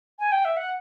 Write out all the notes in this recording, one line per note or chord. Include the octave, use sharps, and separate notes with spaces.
G#5
G5
E5
F#5